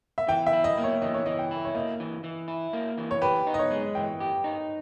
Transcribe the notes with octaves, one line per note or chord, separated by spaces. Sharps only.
E5
E3 G5
E5
E4
D#5
A#3
C#5
E3 D#5
C#5
E3 D#5
G5
E4
C#5
A#3 D#5
E3
E3
E4
A#3
E3
C#5
G4 B4
D#4
D#5
C#5
G#3
E3 G5
G4
D#4